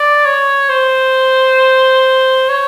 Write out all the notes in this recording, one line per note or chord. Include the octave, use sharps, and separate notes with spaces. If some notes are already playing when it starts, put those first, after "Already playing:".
Already playing: D5
C#5
C5
C#5